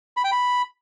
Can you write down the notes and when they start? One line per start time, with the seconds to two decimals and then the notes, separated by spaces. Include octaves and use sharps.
0.17 B5
0.24 G5
0.32 B5